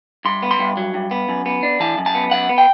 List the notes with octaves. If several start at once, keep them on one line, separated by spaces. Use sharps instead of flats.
G2 C6
B3
C6
G2
F#3
G2
B3
F#2
B3
D4
E3 A5
F#2
A5
B3
F#2 F#5
B3
G5